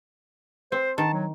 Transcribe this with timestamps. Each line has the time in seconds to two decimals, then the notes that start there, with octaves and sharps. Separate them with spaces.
0.72 C4 C5
0.98 D#3 A5
1.13 F#3